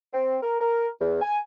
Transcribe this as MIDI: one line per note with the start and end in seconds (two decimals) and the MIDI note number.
0.13 0.36 60
0.42 0.55 70
0.60 0.89 70
1.00 1.17 40
1.22 1.38 80